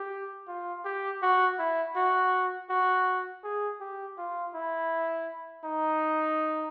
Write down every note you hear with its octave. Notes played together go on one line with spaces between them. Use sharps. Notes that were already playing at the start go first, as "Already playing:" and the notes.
Already playing: G4
F4
G4
F#4
E4
F#4
F#4
G#4
G4
F4
E4
D#4